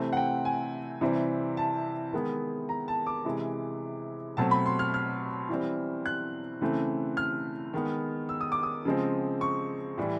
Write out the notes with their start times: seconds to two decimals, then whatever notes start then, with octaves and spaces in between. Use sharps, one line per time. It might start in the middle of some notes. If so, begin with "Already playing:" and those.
Already playing: C3 E3 A3 C4
0.13 F#5
0.17 G5
0.45 G#5
1.01 C3 E3 G3 C4
1.57 A5
2.13 D#3 G#3 B3
2.69 A#5
2.88 A5
3.07 D6
3.25 C3 E3 G#3
4.37 B2 F#3 A3 C4 A5
4.51 B5
4.66 C6
4.79 F6
4.94 F6
5.49 E3 G3 C4
6.06 F#6
6.61 C#3 E3 A3 C4
7.17 F6
7.74 D#3 G#3 B3
8.29 E6
8.41 D#6
8.52 D6
8.63 D#6
8.85 C#3 F3 G#3 C4
9.41 C#6
9.97 A2 E3 G3